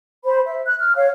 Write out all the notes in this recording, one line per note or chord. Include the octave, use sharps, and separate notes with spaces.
C5 B5
E5
F#6
F6
C#5 F5